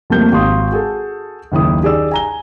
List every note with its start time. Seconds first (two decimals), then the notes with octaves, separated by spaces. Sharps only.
0.10 F2 F3 G3 A3 A#3 G6
0.32 G#1 G4 F5 C6 D#6
0.72 F#4 G#4 A4
1.52 F#1 D#2 E4 D#6
1.82 D#3 G4 G#4 D5 E6
2.12 G#5 A#5 G7